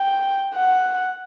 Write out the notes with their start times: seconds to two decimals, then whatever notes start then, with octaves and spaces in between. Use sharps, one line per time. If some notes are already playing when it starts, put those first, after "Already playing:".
Already playing: G5
0.55 F#5